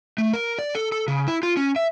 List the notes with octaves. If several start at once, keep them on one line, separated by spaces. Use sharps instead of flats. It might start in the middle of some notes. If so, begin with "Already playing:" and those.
A3
A#4
D5
A4
A4
C#3
E4
F4
C#4
E5